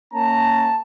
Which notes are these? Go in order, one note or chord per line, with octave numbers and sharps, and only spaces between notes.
A#3 C#4 A5 A#5